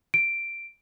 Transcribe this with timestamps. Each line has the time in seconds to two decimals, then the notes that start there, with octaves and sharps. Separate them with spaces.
0.14 D7